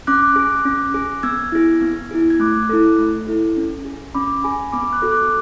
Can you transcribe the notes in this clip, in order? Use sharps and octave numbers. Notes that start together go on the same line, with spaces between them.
C#4 D6 F#6
G#4
C#4
G#4
B3 E6 G#6
E4 G#4
B3
E4 G#4
G#6
A3 D6 F#6
E4 A4
A3
E4 A4
C#4
G#4
C#4 B5 D6
G#4 G#5 B5
B3 B5 D6
D6 F#6
F#4 A4
D6 F#6